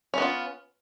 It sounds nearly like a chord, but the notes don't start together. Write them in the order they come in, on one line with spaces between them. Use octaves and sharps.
C#4 B3 F4